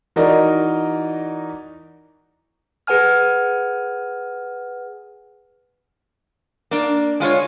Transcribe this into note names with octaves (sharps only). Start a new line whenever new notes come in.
E3 D#4 F#4 A#4 D5 D#5
G#4 B4 F#5 G#5 F6
A#3 D4
G#3 F4 C5 C#5